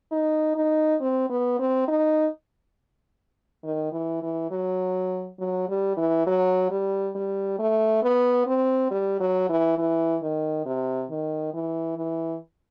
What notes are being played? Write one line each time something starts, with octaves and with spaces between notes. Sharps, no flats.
D#4
D#4
C4
B3
C4
D#4
D#3
E3
E3
F#3
F#3
G3
E3
F#3
G3
G3
A3
B3
C4
G3
F#3
E3
E3
D#3
C3
D#3
E3
E3